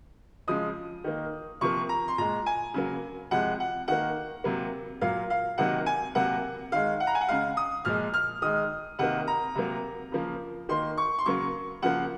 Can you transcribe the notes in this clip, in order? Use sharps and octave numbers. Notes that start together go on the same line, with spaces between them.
C#3 F3 G#3 D#6
D#3 A#3
C3 F3 A#3 C#6
A#5
C6
A#2 G#3 A#5
G#5
C#3 F#3 A#3
C3 F3 G#3 F#5
F#5
D#3 A#3 F#5
C3 F#3 A#3
A#2 F#3 A#3 F5
F5
C3 D#3 F#3 A#3 F#5
G#5
C3 F#3 A#3 F#5
D#3 G#3 F5
F#5
A#5
G#5
F#5
C#3 G#3 F5
D#6
A#2 F3 G#3 F6
F6
D#3 G#3 D#6
C3 D#3 A#3 F#5
A#5
C3 F#3 A#3
C#3 F3 A#3
D#3 A#3 C6
C#6
C6
C#3 F#3 A#3 C#6
C#3 F3 A#3 F#5